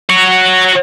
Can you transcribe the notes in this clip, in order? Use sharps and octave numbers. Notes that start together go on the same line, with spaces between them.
F#4 C#5